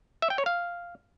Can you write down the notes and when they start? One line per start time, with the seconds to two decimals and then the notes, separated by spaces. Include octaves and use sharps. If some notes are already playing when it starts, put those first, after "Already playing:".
0.22 E5
0.30 G5
0.38 C#5
0.46 F5